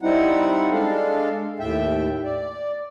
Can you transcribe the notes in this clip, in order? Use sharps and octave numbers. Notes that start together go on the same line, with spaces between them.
G3 C4 D#4 E4 F#5
G#3 D4 A4 F5
D#2 A2 E5 G5
D5